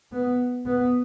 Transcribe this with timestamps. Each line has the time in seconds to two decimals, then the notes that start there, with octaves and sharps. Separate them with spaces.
0.12 B3
0.66 B3